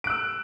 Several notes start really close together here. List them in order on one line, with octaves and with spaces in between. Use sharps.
D7 F#6 E6